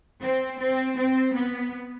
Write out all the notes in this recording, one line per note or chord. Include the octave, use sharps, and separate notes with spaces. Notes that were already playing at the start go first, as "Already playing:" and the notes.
C4
C4
C4
B3